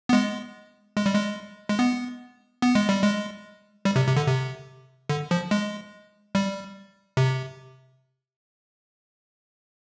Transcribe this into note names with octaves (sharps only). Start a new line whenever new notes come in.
B3
G#3
G#3
G3
G#3
G#3
B3
B3
G#3
G3
G#3
G3
C3
C3
D3
C3
D3
F3
G#3
G3
C3